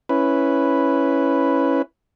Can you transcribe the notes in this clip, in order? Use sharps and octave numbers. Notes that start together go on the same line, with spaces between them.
C#4 E4 B4